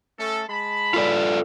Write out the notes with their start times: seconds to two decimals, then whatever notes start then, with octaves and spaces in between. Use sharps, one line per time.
0.18 A3 C#4 A4
0.49 G#3 A5 B5
0.94 F4 A4 D5